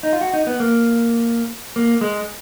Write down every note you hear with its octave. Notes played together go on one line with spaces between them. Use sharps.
D#4
F4
F#4
D#4
B3
A#3
A#3
G#3